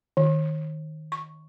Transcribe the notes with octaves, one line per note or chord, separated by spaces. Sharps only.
D#3
C#6